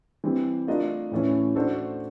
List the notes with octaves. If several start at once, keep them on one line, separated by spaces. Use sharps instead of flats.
E3 G3 C4
A3 D4 F4 A#4 D#5
A2 E3 A3 C#4
A3 D4 F#4 A4 C5